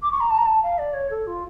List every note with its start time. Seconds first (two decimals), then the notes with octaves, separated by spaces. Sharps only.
0.02 D6
0.12 C#6
0.20 A#5
0.30 A5
0.38 A#5
0.46 A5
0.63 F5
0.78 D5
0.94 C#5
1.10 A4
1.27 F4